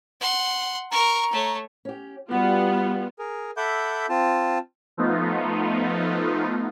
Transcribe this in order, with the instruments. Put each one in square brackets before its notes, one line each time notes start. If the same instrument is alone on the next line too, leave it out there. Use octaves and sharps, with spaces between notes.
[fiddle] F#5 C6
[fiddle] A#4 C#6 [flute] A#5
[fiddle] A3 C#5
[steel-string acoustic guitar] C#4 G4
[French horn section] G3 [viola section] B3 F4 [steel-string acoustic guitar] F#4
[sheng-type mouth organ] G#4 A#4
A4 E5 F#5 B5 D6 G6
C4 F4 A5
[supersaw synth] F3 A3 B3 D#4 F4